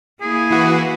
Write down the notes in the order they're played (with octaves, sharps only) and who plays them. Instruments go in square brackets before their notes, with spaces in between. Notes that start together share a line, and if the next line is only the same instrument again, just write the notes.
[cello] A#3 E4 [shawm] G#4
[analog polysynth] E3 F#4